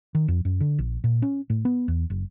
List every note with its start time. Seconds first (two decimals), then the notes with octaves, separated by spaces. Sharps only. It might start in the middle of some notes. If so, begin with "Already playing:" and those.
0.15 D#3
0.28 F2
0.45 F#2
0.60 D3
0.79 A#1
1.04 A#2
1.22 C#4
1.50 A2
1.65 B3
1.88 E2
2.10 F#1